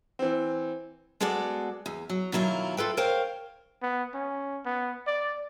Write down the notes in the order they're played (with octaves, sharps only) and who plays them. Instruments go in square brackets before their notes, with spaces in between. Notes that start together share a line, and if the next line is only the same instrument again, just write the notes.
[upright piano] E3 C4
[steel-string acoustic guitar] G#3 B3 F#4 A4 D5
E2
F#3
B2 D#3 F#3 E4 F4
F4 A4 B4 G5
A#4 C5 C#5 F5 G5
[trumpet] B3
C#4
B3
D5